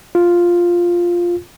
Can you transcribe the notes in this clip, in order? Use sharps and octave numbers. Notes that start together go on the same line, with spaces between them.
F4